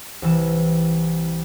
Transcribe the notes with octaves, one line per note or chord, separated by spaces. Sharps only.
C2 E3 E7